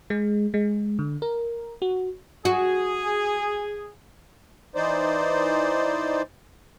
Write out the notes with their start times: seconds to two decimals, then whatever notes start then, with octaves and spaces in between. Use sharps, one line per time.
0.10 G#3
0.54 G#3
0.99 D3
1.22 A#4
1.82 F#4
2.45 F#4 G#4
4.75 E3 D#4 C5 D5